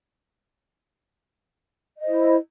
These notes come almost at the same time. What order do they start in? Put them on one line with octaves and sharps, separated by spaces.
D#5 C5 E4